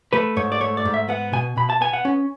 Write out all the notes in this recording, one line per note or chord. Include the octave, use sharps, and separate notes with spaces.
A3 B4
G#2 C#5
D5
A3 C#5
D5
G#2
E5
B3 F#5
B2 G#5
B2 B5
A5
B3 G#5
F#5
C#4